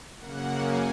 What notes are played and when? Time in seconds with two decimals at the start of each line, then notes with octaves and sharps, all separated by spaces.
0.19 F#2 C#3 A#3 F#5
0.61 G#5